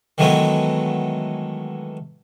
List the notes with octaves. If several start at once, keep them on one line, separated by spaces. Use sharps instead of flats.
D#3 E3 F#3 G#3 A3 B3